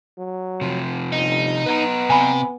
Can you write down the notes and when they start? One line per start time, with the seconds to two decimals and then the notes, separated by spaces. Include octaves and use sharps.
0.18 F#3
0.61 C3 F3
1.13 G1 D#4
1.66 B3 B4 D#5 A#5
2.10 C3 G#5 B5